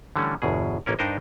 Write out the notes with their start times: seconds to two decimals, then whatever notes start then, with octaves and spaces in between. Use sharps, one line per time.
0.16 D3 E3 G3 A3 C#4
0.42 G1 E2 B2 G#4
0.86 A1 A#3 C#4 A#4
0.99 G2 D4 D#4 A#4 C5 D#5